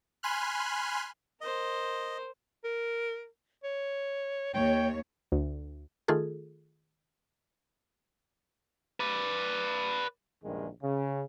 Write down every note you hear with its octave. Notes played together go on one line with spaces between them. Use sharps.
G#5 B5 C6 F6 F#6
A#4 C5 D#5
A#4
C#5
D#2 C#5 G5
D2
D#3 A3 F4 G#4 A4
B4 D5
A#1 E2 G2 D#3 G#3
C#3